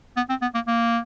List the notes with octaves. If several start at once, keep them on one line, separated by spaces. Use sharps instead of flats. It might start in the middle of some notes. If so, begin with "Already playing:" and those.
B3
C4
B3
A#3
A#3